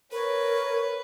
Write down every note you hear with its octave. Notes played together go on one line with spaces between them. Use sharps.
A#4 B4 C#5